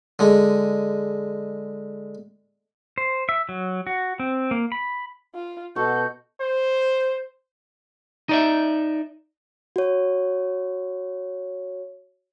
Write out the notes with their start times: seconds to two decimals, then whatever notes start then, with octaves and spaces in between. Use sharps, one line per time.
0.19 D3 G#3
2.98 C5
3.29 E5
3.49 F#3
3.87 F#4
4.20 C4
4.51 A#3
4.72 B5
5.35 F4
5.76 B2 F#4 A4 G6
6.40 C5
8.29 D#4 D5 E5
9.76 F#4 C#5